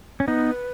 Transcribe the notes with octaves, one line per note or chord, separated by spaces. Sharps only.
C#4
B3 D#4 B4